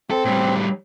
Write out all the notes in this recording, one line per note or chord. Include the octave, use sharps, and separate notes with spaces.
C4 A4
A2 G3